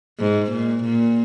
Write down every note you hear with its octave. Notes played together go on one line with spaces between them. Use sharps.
G#2
A#2
A#2